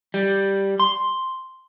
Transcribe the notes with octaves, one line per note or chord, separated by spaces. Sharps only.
G3
C6